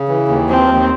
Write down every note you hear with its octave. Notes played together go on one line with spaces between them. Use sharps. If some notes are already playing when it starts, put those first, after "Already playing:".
Already playing: C#3
E3
D#2
F3 C4
D#2